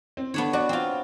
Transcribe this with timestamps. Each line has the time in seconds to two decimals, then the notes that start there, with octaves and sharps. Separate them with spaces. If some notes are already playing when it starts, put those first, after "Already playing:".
0.17 C4
0.34 D3 B3 D4 C#5
0.53 F#4 D5
0.69 C4 F4 G5